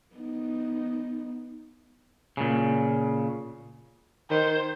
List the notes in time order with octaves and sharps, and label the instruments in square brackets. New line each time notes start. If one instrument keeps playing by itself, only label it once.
[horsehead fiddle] B3 D#4
[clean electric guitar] A#2 C#3
[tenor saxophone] D#3 [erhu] C5